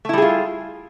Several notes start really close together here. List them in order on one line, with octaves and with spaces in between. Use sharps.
A3 E4 G3 G#4 F4